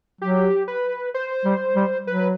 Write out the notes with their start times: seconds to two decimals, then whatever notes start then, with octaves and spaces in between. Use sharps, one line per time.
0.21 F#3 G4
0.68 B4
1.14 C5
1.45 G3
1.76 G3
2.07 F#3 B4